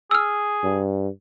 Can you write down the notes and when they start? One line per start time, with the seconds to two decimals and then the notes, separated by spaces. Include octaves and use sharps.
0.11 G#4 E6 F6
0.64 G2